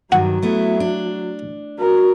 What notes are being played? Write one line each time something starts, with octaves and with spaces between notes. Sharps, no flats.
G2 D#3 F#3 F#4
A3 B3 E4
D4
F#4 A#4